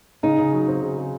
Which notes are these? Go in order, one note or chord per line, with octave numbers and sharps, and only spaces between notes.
C#3 D#4
C#3
F#3
C4
C#3
C#3